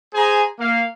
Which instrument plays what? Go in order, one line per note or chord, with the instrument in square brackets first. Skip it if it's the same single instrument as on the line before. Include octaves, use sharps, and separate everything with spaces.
[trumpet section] G#4 C5 G#5 A#5
A#3 F5